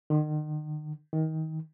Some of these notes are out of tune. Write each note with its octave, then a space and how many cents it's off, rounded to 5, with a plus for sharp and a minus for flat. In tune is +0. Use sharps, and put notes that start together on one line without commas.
D#3 -40
D#3 +25